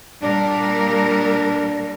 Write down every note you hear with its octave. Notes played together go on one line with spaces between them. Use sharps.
A#2 G3 D4 A#4